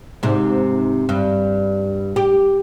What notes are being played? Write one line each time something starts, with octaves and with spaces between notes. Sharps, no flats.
G#2 C3
G2
G4